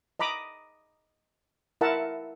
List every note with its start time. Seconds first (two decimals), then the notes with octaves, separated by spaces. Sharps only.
0.19 D#5 A#5 B5 D6 D#6
1.81 E4 A#4 E5 F#5 A5